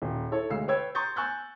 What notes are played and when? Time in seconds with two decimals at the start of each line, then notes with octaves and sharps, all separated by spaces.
0.02 D#1
0.32 E4 A4 C#5
0.50 D2 G#3 F5 E6 C7
0.68 B4 C#5 G5 E6 G#6
0.95 A#5 C6 C#6 D#6 G6 A6
1.16 G#5 C#6 E6 F#6 G6 A6